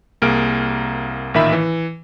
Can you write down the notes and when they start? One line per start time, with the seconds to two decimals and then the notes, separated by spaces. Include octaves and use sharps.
0.22 C2 A#3 G#4 F6 D7
1.34 A1 A#2 D#3 E5 B5
1.52 E3